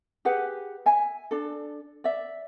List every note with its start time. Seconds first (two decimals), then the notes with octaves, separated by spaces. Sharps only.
0.25 G4 G#4 B4 F#5
0.86 E5 G#5
1.31 D4 A4
2.04 D5 E5